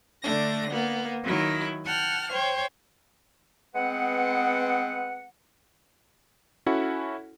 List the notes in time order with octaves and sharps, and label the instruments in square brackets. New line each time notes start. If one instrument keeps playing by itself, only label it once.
[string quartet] D3 A3 D4 A#6
A#3 B3
D#3 F#3 E4
F#5 G5 A5 F6
C5 C#5 G5
[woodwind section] G#3 B3 C4 B4 F#5
[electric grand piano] C#4 E4 F#4 A4 F#5